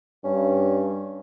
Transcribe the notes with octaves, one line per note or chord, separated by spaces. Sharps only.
G2 C#4